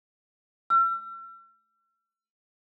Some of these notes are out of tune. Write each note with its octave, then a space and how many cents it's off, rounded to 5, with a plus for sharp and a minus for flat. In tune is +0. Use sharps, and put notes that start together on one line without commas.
E6 +45